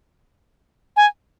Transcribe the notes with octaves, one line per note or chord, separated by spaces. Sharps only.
G#5